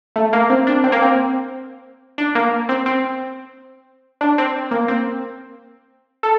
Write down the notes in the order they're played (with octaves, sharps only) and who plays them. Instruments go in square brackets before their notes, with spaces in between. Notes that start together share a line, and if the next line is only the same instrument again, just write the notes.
[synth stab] A3
A#3
C4
D4
C4
A#3
C4
D4
A#3
C4
C4
D4
C4
A#3
C4
A4